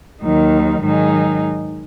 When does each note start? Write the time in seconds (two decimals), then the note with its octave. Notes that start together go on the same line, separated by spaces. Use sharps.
0.22 D#2 D#3 F#3 D#4
0.81 G#2 D#3 F#3 D#4 G#4